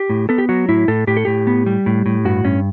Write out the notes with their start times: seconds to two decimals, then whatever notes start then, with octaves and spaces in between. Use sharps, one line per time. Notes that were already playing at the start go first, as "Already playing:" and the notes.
Already playing: G4
0.10 A2
0.29 B3 A4
0.38 G4
0.49 F#3 F#4
0.69 A2 E4
0.88 A2 A4
1.07 A2 G4
1.17 A4
1.25 A2 G4
1.47 B3
1.66 G3
1.86 A2
2.06 A2
2.25 G2 F#4
2.44 G2 C#4